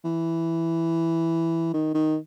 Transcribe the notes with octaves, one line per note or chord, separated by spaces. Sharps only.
E3
D#3
D#3